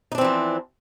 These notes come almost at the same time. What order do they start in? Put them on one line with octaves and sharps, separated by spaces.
D#4 D4 C4 E3 F3